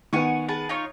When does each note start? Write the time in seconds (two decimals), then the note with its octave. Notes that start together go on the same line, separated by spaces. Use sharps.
0.13 D#3 B3 F#5 G#5 C#6
0.49 G#4 B4 A5
0.69 D#4 F4 C#5